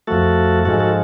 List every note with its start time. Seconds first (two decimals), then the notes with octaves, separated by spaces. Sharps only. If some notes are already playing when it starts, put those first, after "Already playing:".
0.07 F2 F3 A3 F#4 A4
0.65 G#2 F3 G#3 F#4 A4
0.79 F#4 A4